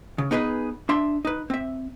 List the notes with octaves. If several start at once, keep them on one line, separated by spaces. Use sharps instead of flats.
C#3
B3 D#4 G#4 A#4 B4
D4 E5 C6
D#4 B4
C4 E5